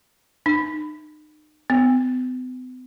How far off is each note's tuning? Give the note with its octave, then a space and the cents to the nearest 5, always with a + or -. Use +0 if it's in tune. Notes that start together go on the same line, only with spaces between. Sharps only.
D#4 -35
B3 +45